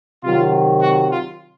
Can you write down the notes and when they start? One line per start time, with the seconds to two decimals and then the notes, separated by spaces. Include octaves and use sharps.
0.24 C3 D#3 F#3 F4
0.81 F#4
1.09 F4